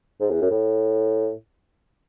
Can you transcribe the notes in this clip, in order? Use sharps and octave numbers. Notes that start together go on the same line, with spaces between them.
G#2
E2
F#2
A2